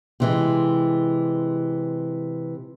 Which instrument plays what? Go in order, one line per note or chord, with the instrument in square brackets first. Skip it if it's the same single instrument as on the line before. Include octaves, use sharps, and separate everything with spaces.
[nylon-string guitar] C3 E3 G#3